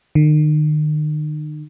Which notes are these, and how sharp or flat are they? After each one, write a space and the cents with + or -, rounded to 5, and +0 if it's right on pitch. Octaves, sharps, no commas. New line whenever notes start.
D#3 -40